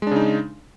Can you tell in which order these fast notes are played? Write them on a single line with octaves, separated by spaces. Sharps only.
G#3 D4 C#3 D#4